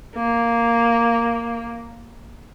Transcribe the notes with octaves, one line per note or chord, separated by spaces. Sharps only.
A#3